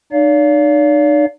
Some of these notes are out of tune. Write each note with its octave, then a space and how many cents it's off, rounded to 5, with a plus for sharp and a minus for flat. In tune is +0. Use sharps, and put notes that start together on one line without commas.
D#4 -45 D5 -40 F5 +0